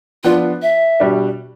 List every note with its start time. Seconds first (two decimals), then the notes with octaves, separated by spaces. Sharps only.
0.24 F3 B3 D4 F4
0.62 E5
1.00 B2 G3 D4